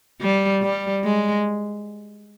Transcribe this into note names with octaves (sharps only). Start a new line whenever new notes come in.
G3
G3
G#3